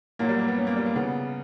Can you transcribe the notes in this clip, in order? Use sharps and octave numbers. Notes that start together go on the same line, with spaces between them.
A#2 F#3 A#3
G3
A#3
B3
C#4
A#3
G3
A#3
C#3 B3